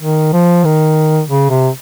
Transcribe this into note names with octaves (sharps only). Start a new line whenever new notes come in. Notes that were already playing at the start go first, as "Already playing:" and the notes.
D#3
F3
D#3
C#3
C3